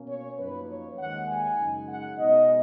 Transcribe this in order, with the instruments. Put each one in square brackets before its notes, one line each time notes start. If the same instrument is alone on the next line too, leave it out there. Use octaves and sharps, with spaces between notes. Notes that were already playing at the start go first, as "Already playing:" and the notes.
Already playing: [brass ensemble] B2 A#3 C#4
C#5
F#2 F3 A#3 D#4 B4
C#5
D#2 D#3 G#3 F#5
G#5
F#2 C#3 G#3 D#4
F#5
B2 G#3 B3 D#4 D#5